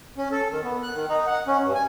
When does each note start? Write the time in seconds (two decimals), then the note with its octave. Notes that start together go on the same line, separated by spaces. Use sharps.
0.18 C#4
0.32 A4
0.52 D#3
0.64 B3
0.83 F#6
0.94 D#3
1.09 D#4
1.27 F#5
1.47 C#4
1.64 G2
1.75 G#5